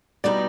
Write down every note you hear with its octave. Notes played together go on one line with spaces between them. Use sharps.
B2 G3 B3 D#4 D5